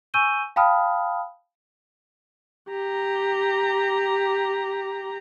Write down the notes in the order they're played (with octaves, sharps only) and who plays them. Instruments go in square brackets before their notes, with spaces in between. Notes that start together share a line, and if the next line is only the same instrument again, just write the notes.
[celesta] G#5 C#6 E6 G6 D#7 G7
F5 G5 A5 B5 D#6 F6
[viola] G4 A#5